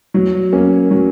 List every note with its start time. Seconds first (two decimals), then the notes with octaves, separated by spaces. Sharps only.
0.14 F#3
0.53 A#3 C#4
0.91 F#3